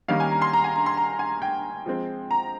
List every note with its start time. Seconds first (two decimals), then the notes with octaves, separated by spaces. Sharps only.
0.08 D#3 G3 A#3 C#4 F5
0.20 G#5
0.31 A#5
0.42 C6
0.53 A#5
0.64 G#5
0.76 A#5
0.86 C6
0.97 A#5
1.19 G#5
1.42 G5
1.86 F3 G#3 C4
2.31 A#5